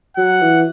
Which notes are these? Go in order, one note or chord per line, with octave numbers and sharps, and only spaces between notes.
F#3 F#5
E3